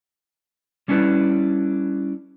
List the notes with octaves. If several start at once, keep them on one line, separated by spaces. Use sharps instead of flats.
G3 C#4 D4 E4 B4